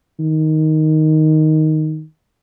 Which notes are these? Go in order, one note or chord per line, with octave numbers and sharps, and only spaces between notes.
D#3